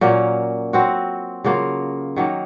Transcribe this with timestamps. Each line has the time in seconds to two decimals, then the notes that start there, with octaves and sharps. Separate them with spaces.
0.01 A#2 F#3 A#3 C#4
0.73 F#3 C4 F#4
1.44 C#3 F#3 A#3 F4
2.16 D#3 F#3 A#3